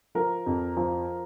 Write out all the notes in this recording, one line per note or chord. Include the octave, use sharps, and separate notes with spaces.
F3 A#4
F2
F3